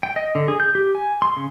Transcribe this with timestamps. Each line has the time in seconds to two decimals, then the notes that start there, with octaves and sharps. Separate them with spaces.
0.03 G5
0.16 D#5
0.35 D3
0.48 G#4
0.60 G6
0.75 G4
0.95 G#5
1.22 C6
1.37 C#3